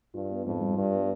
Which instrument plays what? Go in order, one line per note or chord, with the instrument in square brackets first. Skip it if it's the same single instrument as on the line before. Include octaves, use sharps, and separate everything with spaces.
[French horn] G2 [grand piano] F4
[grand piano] B3
[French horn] F2 [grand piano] G#2
[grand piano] G3
[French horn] G2 [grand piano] F4
[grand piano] B3